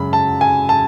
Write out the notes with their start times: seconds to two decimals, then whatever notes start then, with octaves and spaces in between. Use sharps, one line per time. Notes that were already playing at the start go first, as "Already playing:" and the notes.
Already playing: F#2 C#3 G#3 C#4 B5
0.13 A5
0.41 G#5
0.69 A5